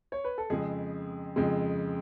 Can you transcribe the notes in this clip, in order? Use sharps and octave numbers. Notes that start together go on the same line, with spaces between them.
C#5
B4
A4
F2 C#3 G#3 G#4
F2 C#3 G#3